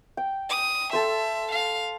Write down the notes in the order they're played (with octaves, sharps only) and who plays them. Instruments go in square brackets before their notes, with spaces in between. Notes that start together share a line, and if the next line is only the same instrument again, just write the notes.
[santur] G5
[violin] D#6
[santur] A4 C5 [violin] E5
[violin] F5